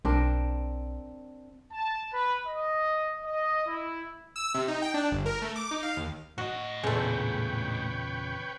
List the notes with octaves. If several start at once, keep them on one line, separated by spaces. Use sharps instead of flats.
B1 C4 D4 A#4
A5
B4
D#5
D#5
E4
E6
C3
D#4
G5
D4
G1
A#4
A3
D6
D#4
F5
D#2
A2 F#4 D#5
E2 A#2 C#3 G#3 A3 B4 C#5 G5